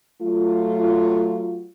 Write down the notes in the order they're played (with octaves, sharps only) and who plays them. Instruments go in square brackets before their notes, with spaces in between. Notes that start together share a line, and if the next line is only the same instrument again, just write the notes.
[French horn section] F#3 A3 F4